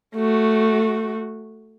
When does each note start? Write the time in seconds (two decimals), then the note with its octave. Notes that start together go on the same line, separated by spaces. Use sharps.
0.15 A3 F#4